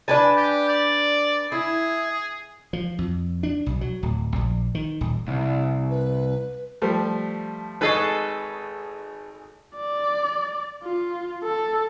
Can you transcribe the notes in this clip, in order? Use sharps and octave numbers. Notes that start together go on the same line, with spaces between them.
D4 B4 G#5 A5
G4
D5
E4 G#4
F3
F2
D4
B1
F#3
D1
A#1
D#3
D#1
C2
B4
F3 G3 A3
G#1 G#4 A4 B4 D#5 C#6
D5
F4
A4